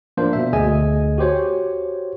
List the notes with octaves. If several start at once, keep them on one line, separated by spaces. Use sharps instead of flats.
F3 A#3 D4 C5
B2 E5
D2 G#4 D#5 G#5
F#4 G4 C5 C#5